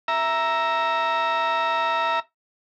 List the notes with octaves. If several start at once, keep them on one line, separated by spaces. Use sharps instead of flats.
E5 A#5